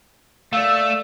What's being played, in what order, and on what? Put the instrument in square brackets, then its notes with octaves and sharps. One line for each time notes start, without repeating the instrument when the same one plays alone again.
[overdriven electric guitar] A3 [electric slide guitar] D5 F5 [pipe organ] E6